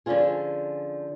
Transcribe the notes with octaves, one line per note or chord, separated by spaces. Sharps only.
D3 F3 C#4 D4 F4 G#4